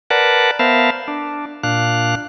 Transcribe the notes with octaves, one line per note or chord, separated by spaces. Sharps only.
A#4 B4 D5 F#5 A5
B3 A#4 C5 E5 F5 A5
D4
A#2 D4 F5 F#6